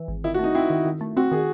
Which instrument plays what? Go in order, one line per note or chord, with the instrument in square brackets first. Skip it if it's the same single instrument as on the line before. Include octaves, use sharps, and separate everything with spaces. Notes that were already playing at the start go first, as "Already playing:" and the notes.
Already playing: [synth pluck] E3
G#1
[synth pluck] D#3 [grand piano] E4
[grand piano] F#4
[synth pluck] A3 [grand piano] D#4
[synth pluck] C4 [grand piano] E4
[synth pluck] D#3
D#3
A3
[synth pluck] C4 [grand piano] F#4
[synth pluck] D#3 [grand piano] G#4